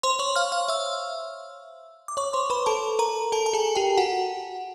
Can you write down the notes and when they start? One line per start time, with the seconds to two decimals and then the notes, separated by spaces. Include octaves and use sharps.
0.03 C5 C6
0.19 C#5 C#6
0.36 F5 F6
0.52 F5 F6
0.68 E5 E6
2.08 D6
2.17 C#5 C#6
2.33 C5 C6
2.50 B4 B5
2.66 A4 A5
2.99 A#4 A#5
3.32 A4 A5
3.46 A5
3.53 G#4 G#5
3.75 G4 G5
3.97 F#4 F#5